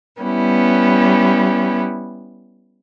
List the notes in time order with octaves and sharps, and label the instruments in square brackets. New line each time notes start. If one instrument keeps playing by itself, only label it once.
[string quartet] G3 B3 C#4 E4